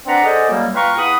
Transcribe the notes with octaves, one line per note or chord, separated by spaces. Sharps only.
C4 D4 B4 D5 F#5 A#5
G#4 A4 C5 D5 D#5 F#5
F#2 F#3 G3 A#3
F4 B4 F5 G5 A#5 C#6
E2 F#5 B5 D#6